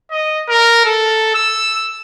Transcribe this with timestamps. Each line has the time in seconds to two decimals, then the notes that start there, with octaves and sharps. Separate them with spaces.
0.12 D#5
0.50 A#4
0.85 A4
1.35 E6